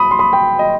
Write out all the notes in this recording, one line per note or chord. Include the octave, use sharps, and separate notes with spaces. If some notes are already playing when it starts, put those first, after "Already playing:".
Already playing: B5 D#6
C6
B5 D#6
G5 B5
D#5